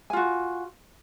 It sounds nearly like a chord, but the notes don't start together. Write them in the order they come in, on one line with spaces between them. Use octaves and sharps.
G#5 F4 F#4